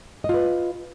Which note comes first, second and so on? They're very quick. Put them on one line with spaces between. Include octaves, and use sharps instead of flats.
D#5 F4 B4